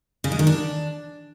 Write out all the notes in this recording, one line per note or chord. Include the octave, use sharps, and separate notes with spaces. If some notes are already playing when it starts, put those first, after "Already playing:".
C#3
G#3
D#3
D4